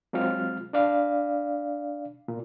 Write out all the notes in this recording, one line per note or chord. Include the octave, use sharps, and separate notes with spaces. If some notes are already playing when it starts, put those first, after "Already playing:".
F#3 G#3 C4 F4 F6
D4 D5 F5
A#2